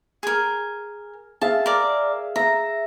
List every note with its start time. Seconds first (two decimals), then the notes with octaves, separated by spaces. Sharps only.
0.23 G#4 A#4
1.42 G#4 E5 F5 A5
1.66 A#4 D5
2.36 E5 A#5